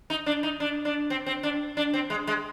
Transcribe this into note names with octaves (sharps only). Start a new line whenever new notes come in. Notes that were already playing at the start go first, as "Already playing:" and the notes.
D#4
D4
D#4
D4
D4
C4
C4
D4
D4
C4
G#3
G#3